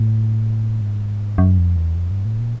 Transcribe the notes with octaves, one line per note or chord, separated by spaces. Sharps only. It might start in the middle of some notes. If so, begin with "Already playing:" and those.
Already playing: A2
G#2
F#2
F2
E2
F2
G2
A2
A#2